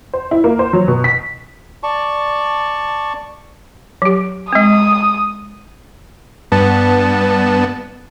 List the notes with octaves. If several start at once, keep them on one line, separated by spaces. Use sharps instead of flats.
C5
E4
A#3
C5
F#3
B2
B6
D5 A5 C#6
F#3 G4
G#3 C4 D#6
G2 B3 A5